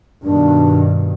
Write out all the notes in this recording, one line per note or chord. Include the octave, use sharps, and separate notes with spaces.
G2 B2 D#3 D4